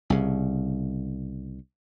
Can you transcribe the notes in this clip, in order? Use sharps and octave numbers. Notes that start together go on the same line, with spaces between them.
C2 C#3